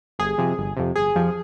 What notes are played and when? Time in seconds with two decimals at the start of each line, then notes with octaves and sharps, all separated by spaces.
0.19 G1 G#4
0.38 F2 C3
0.58 G1
0.77 F2 C3
0.96 G1 G#4
1.15 F2 C3 F3